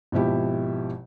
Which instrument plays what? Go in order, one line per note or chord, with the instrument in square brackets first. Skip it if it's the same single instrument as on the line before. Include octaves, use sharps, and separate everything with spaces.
[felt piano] G#1 B2 F3 E4 G4